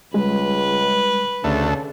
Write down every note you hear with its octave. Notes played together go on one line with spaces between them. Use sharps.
C#2 G3 G#3 B4
D2 C#3 A3